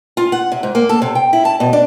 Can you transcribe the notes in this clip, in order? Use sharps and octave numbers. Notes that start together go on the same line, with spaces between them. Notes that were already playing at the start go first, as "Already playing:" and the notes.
F4
F#5
C3
G#2
A#3
A4
C3
G5
E4
A5
B2
D4